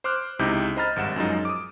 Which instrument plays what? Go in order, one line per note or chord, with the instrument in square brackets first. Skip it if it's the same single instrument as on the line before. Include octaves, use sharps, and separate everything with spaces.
[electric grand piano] C5 C6 D6 F6 F#6
C#2 C3 D#4 E4 D6 G6
C5 D#5 A#5 B5 F6 A6
G#1 G2 F#5 E7
F#2 F3 F#3 G#3 D#4
D6 D#6